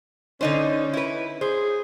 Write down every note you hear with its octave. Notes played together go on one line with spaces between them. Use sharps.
D3 C#4 D#4 C5
E4 B4
G#4 C5